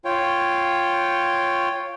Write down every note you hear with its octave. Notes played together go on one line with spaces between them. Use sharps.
F4 C#5 G5